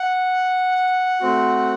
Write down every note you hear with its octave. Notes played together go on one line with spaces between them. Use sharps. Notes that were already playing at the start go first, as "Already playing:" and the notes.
Already playing: F#5
A3 C4 F#4